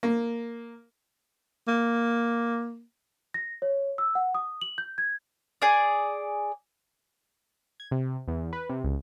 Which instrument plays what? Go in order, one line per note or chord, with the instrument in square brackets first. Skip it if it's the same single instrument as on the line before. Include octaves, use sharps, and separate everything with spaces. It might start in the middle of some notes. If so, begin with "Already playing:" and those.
[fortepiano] A#3
[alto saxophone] A#3
[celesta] A#6
C#5
E6
F#5
D#6
F#7
G6
G#6
[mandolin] G#4 D5
[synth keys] G#6
C3
E2
B4
C3
C#2